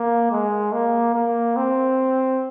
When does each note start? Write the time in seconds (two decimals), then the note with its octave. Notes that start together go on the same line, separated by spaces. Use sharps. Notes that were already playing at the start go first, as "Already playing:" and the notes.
Already playing: A#3
0.31 G#3
0.73 A#3
1.14 A#3
1.56 C4